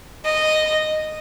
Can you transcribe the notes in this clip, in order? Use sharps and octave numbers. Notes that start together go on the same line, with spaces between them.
D#5